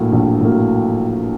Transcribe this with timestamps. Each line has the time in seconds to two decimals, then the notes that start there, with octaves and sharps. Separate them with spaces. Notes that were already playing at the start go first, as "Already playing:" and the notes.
Already playing: A#1 A2 F#3 A#3
0.12 A#1
0.41 A2 F#3 A#3